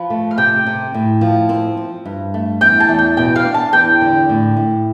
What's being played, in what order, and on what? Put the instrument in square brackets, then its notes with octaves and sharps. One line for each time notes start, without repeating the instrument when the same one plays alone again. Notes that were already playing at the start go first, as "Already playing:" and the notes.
Already playing: [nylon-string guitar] F3 [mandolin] B4
[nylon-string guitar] A3
[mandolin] F5
[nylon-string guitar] C3 [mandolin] G5
[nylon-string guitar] C3
A2
F3
C4
C4
G2
A3
[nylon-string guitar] E2 [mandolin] G5
[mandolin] A5
[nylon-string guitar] E2
[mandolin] G5
[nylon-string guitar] B2 [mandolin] G5
[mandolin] F5
[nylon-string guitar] D4
[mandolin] A5
[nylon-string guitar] E2 [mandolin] G5
[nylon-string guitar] D3
A2
A2